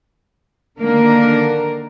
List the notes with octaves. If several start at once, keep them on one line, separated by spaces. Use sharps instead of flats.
D3 D#3 A#3 D4 A#4